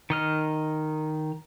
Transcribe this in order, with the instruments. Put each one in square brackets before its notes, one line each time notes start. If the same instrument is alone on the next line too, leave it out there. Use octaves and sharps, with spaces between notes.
[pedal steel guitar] D#3 D#5 F6